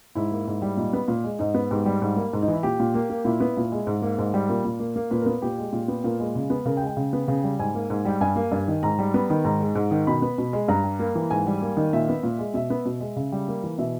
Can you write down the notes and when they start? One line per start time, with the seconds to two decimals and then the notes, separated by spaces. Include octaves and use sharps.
0.15 G#2 E4
0.32 A#3
0.47 G#2
0.62 G3
0.77 A#2 D#4
0.93 B3
1.08 A#2
1.24 G#3
1.39 G#2 D#4
1.54 B3
1.70 G#2 G4
1.86 G3
2.02 G#2
2.16 A#3
2.33 G#2
2.42 D#4
2.48 E3
2.53 E4
2.63 A#2 G4
2.80 A#2
2.94 A#3
3.10 A#3
3.25 A#2 E4
3.40 B3
3.57 A#2
3.72 G#3
3.87 G#2
4.02 A#3
4.18 G#2
4.34 G3
4.49 A#2 A#4
4.64 A#2
4.80 A#3
4.96 A#3
5.11 A#2 B4
5.22 B3 A#4
5.42 A#2 G4
5.58 G#3
5.73 A#2
5.88 B3
6.04 A#2 A#4
6.20 G#3
6.35 C#3
6.50 B3
6.65 C#3 A#4
6.77 G5
6.82 G#3
6.87 G5
6.97 C#3
7.13 B3
7.28 C#3
7.44 G3
7.59 G#2 G#5
7.75 A#3
7.90 G#2
8.05 G3 G5
8.21 G2 G#5
8.36 A#3
8.51 G2
8.68 D#3
8.83 G#2 A#5
8.99 G3
9.14 B3
9.30 D#3
9.45 G#2 A#5
9.60 G#3
9.75 G#2
9.91 D#3
10.07 B2 B5
10.22 B3
10.38 B2
10.53 G#3
10.68 G2 A#5
10.84 G3
10.99 A#3
11.15 E3
11.31 G#2 G#5
11.47 G3
11.62 A#3
11.77 D#3
11.93 A#2 E5
12.09 B3
12.23 A#2
12.38 G#3
12.54 B2 E5
12.70 B3
12.85 B2
13.00 G#3
13.16 C#3
13.32 G3
13.48 A#3
13.64 E3
13.78 B2 E5